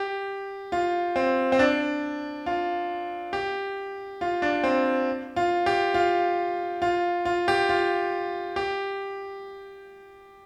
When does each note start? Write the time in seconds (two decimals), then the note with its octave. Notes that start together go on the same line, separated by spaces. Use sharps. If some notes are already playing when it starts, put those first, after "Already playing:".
Already playing: G4
0.72 F4
1.16 C4
1.52 C4
1.59 D4
2.46 F4
3.33 G4
4.21 F4
4.42 D4
4.64 C4
5.36 F4
5.66 G4
5.94 F4
6.82 F4
7.25 F4
7.48 G4
7.69 F4
8.56 G4